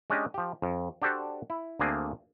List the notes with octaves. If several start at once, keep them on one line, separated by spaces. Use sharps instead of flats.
G#3 C#4 D4 G4 D#5
F3 G4
F2
D4 F#4 G4 A4 C5 D5
E4
D2 A3 A#3 C4 D4 G#4